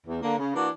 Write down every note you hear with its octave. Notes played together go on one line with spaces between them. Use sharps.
E2
D3 A#3
C#3
E3 A#3 D4 F#4